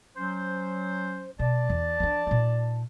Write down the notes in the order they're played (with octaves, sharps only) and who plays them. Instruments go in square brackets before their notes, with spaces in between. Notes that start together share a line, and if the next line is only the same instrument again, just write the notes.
[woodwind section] F#3 C#4 C5
[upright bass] B2 [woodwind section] D5 A5
[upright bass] E2
F3 D4
A#2 D#4